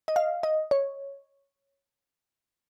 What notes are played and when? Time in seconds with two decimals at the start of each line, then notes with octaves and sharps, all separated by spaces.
0.08 D#5
0.16 F5
0.43 D#5
0.71 C#5